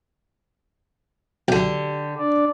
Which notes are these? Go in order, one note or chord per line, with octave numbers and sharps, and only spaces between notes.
B1 D3 G4
D4 D5